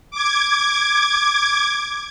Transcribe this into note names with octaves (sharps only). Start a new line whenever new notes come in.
D6 G#6